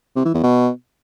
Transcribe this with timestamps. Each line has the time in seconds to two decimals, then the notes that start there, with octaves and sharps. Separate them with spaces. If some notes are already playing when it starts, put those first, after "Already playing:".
0.16 C3
0.25 E3
0.34 E2
0.43 B2